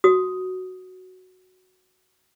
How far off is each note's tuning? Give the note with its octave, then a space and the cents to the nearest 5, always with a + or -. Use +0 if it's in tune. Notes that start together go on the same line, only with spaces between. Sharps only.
F#4 +0 D#6 +5